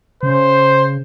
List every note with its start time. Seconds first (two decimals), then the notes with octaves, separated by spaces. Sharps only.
0.23 C#3 C5